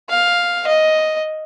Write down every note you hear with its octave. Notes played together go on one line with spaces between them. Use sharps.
F5
D#5